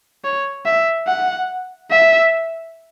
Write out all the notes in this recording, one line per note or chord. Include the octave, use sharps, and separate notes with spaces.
C#5
E5
F#5
E5